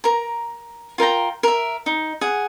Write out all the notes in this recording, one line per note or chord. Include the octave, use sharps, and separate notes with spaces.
A#4 A#5
F4 A#4 G5 A#5
A#4 E5
D#4
G#4 F#5